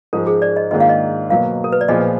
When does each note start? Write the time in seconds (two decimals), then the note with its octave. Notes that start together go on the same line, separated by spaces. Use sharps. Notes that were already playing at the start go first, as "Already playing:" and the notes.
0.13 G#2 F3 G#3 A#4
0.27 G#4
0.42 D5
0.56 D#5
0.71 G#2 D#3 A#3 D4 F4 D#5
0.80 F5
0.89 D#5
1.30 B2 F#3 A#3 F5
1.64 A#4
1.72 B4
1.81 D5
1.88 A#2 F3 B3 F4 G#4 D#5